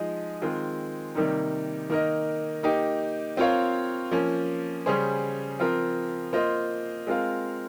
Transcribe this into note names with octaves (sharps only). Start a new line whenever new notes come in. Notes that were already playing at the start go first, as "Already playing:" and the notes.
Already playing: F3 G#3 D#4 G#4 D#5
D#3 G#3 C4 F4 G#4
C3 D#3 G3 A#3 D#4
D#3 A#3 D#4 A#4 D#5
A#3 D#4 G4
C4 F4 A#4 C#5 F5
F3 A#3 C#4
C#3 G3 C#4 G#4 C5
F3 C4 F4 A#4
A#3 F4 C5 D#5
G#3 C4 F4 A#4 F5